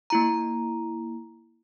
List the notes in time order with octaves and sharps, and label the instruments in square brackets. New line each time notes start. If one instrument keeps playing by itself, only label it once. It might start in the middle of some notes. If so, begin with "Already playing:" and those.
[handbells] A#3 E4 A#5